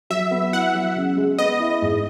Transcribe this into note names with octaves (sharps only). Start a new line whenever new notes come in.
F#3 E5
B3
E4 F#5
F#3
C#3
G#3
B3 D#5
E4
G#2